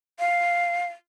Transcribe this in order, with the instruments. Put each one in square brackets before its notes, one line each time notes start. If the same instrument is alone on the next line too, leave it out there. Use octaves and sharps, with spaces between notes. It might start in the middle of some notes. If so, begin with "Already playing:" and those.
[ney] F5